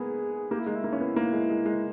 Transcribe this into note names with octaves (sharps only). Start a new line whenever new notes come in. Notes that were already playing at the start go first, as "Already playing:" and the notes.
Already playing: G#3 A#3 B3 G#4
A#3 G4
E4
G#3 D#4
E4
A#3
C#4
B3
A#3
G#3
G#3
G#3